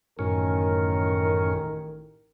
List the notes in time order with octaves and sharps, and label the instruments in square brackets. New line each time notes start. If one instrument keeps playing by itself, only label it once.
[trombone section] A1 D#3 A#4 [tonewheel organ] F#2 A2 C#4